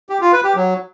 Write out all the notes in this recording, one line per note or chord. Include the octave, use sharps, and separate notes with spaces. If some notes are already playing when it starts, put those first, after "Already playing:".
G4
F4
B4
G4
F#3